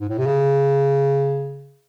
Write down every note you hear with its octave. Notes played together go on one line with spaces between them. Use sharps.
G#2
A2
C3
C#3